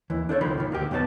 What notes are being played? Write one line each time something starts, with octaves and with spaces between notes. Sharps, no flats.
D#2 E3
D4 A4 C5 C#5
C#2 D#3 F3 B5
A#2 D#3
D2 A#3 G4
B1 F2 B3 C5 A5